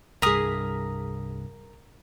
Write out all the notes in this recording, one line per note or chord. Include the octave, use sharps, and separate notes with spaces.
C2 G2 G#4 A#4 D#6 B6